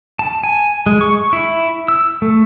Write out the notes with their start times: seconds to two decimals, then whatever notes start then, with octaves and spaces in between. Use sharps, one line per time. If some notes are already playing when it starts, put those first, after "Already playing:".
0.19 A5
0.44 G#5
0.86 G#3
1.01 C#6
1.33 E4
1.88 E6
2.22 A3